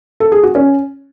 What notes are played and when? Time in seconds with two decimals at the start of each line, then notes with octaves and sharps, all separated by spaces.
0.20 A4
0.32 G#4
0.43 F#4
0.55 C#4